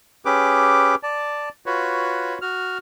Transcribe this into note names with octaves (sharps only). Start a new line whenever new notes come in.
C#4 G4 G#4 B4 D6
D5 A5
F4 F#4 B4 C#5
F#4 F6